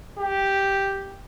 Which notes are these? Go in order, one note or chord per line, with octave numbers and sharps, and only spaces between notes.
G4